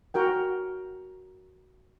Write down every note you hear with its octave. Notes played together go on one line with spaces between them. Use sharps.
F#4 A#4 G5